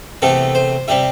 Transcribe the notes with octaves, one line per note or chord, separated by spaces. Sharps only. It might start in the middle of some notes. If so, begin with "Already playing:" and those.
E2 C3 A3 C4 A4
C5
C3 G3 C4 E5